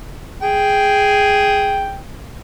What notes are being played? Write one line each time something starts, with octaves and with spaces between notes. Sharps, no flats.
G#4 G5